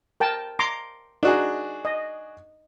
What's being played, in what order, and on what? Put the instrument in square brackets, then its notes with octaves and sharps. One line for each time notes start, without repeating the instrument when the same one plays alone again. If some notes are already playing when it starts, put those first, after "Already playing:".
[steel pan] A#4 G5 A5
A#5 C6 D6
[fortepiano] D4 F#4 G#4 [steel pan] D#4
[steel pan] D#5